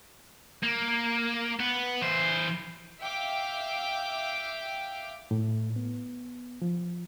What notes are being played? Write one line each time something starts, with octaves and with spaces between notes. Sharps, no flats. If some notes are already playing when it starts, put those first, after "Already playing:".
A#3
B3
E3 C5
E5 F5 G5 D6
A2
B3
F3